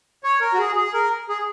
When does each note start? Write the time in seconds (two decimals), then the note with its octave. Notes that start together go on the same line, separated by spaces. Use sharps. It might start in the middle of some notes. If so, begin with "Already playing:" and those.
0.24 C#5
0.40 A#4
0.54 F#4
0.59 G#4
0.76 G#4
0.94 A#4
1.29 G#4